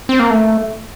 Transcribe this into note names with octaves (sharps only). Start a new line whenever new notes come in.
C4
A#3
A3